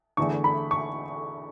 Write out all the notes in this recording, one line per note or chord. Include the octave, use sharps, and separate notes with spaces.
E2 D3 A3 C#6
B5
C#6